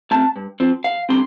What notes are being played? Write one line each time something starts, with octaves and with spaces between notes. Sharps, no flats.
A3 C4 A5
G2
F3 C4
E2 F5
D3 G3 C4 C6